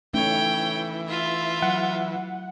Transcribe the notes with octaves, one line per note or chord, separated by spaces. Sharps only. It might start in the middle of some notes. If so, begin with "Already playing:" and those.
E3 A3 C#4 D#4 C#5 G5
F4 E5
F#3 F#5